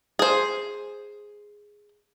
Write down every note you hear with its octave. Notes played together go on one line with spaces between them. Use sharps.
G#4 C5